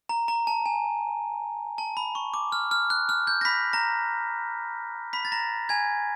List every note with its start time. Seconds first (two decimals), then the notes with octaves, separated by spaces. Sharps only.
0.09 A#5
0.28 A#5
0.47 A5
0.66 G#5
1.78 A5
1.97 B5
2.15 C#6
2.34 D6
2.52 F6
2.71 F6
2.90 F#6
3.09 F6
3.27 G6
3.41 A#6
3.45 B5 B6
3.73 A#5 A#6
5.13 B5 B6
5.25 A6
5.32 A#5 A#6
5.69 G#5 G#6